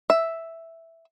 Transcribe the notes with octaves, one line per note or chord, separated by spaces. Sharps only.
E5